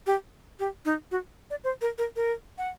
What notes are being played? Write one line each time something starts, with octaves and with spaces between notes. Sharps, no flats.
G4
G4
D#4
F#4
D5
C5
A#4
A#4
A#4
F#5